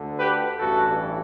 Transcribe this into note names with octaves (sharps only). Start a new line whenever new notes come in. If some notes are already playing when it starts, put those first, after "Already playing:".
Already playing: D2 D3
G4 B4
A1 G2 E3 F#4 A4